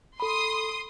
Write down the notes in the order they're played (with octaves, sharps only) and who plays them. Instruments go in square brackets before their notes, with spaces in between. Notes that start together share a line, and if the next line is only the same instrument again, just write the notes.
[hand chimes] A4 B5 [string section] C6 D#6